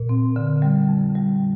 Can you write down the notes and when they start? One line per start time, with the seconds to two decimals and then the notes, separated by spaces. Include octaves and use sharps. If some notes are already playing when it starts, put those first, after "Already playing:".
Already playing: A#2
0.09 C4
0.36 D3
0.62 G3
0.89 F2
1.15 G3